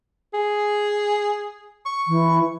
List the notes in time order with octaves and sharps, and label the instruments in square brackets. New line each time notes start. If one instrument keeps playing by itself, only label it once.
[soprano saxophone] G#4
C#6
[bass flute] E3